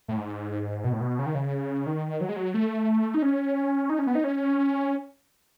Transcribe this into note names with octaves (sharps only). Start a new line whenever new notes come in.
A2
G#2
B2
A2
B2
C#3
D#3
C#3
D#3
F#3
G#3
F#3
A3
D#4
C#4
D#4
C#4
B3
D#4
C#4